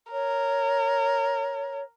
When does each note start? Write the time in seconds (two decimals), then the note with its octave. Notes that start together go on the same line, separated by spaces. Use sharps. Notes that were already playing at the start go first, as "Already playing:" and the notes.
0.12 A#4 C#5